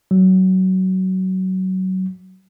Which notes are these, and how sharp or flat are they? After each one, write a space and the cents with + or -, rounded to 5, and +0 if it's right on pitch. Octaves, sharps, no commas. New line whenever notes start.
F#3 +20